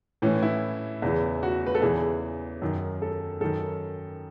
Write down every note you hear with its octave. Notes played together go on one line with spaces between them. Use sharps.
A2 E3 C#4
E4
E2 C#3 E3
F#4
B4
A4
E2 C#3 E3 G#4
F#2 D#3
A4
F#2 D#3 A4